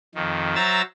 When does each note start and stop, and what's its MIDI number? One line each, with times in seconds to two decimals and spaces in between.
0.15 0.55 41
0.15 0.55 51
0.55 0.82 54
0.55 0.82 72
0.55 0.82 76
0.55 0.82 82
0.55 0.82 88
0.55 0.82 93